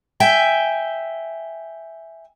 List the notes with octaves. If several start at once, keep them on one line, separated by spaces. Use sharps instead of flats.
E5 G5 G#5